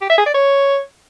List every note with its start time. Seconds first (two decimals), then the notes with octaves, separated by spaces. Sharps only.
0.02 G4
0.10 E5
0.18 G#4
0.26 D5
0.34 C#5